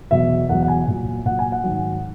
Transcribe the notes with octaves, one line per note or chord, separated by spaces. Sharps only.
E2 B2 F#3 E5
E2 B2 F#3 F#5
F#5
G#5
A#2 F#3
A#2 F#3 F#5
G#5
F#5
G#2 D#3 F#3